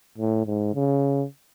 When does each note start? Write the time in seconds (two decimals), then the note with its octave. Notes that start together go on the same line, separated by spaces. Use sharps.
0.18 A2
0.46 G#2
0.75 C#3